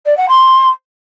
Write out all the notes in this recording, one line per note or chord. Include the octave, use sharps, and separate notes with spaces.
D5
F#5
C6